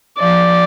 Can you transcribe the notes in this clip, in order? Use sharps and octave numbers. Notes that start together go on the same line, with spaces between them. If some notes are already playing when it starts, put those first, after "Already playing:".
F3 D5